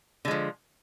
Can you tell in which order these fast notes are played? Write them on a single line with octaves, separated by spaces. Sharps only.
D3 G#3 F3